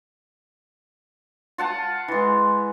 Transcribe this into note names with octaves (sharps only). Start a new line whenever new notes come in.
F4 F#5 A5
E3 G#3